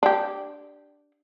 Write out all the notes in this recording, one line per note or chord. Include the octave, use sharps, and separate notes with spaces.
D4 G4